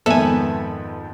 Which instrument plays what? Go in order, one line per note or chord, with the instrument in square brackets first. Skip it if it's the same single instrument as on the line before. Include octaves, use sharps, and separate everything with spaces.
[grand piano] F2 G#2 D#3 [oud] B3 C#5 E5 [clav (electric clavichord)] A4 G#5